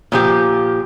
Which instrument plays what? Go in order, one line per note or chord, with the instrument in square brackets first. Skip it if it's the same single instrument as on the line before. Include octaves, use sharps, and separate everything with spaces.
[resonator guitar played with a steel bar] A#2 F3 G4